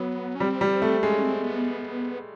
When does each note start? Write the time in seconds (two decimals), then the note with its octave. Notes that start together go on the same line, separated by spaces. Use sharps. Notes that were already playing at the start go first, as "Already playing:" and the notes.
Already playing: F#3 B3
0.35 C#4
0.40 G3 C4
0.61 G3
0.82 A3
1.03 G#3 C#4
1.23 C4
1.44 B3